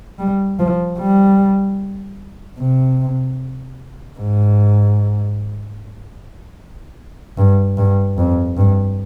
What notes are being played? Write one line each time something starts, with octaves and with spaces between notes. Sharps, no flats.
G3
F3
G3
C3
G#2
G2
G2
F2
G2